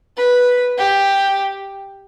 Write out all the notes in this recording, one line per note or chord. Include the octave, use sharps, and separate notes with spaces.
B4
G4